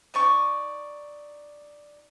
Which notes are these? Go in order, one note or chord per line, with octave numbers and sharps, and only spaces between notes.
D#4 D5 C#6